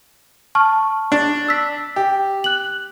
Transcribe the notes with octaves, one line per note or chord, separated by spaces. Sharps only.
A5 C#6 F6
D4
E6 B6
G4
F#6 F#7